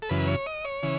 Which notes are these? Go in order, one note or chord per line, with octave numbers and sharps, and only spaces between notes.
A4
F#2 C#3 E3 B4
C#5
D#5
C#5
C#3 E3